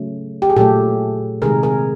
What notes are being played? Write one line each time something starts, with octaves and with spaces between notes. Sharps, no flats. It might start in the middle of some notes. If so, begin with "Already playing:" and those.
Already playing: C#3 F#3 A3
G4
G#4
A#2 F#3 A3 G4 A4
C3 D#3 G#3 G#4 A#4
G#4 A#4